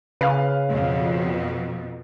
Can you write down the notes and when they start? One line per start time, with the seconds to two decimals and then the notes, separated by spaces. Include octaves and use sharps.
0.21 C#3 B4 F5
0.68 F2 B2